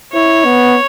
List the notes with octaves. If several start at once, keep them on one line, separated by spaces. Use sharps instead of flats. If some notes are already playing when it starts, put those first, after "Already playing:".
E4 C#5
B3